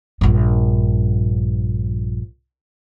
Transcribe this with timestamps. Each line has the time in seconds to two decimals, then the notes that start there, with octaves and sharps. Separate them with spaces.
0.21 A#1 G2